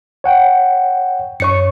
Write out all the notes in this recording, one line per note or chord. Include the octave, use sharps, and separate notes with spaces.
C#5 F#5 G5
F#2 C#5 C#6 C#7